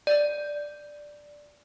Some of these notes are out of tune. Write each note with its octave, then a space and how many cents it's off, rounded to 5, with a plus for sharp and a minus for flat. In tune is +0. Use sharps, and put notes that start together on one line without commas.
D5 +0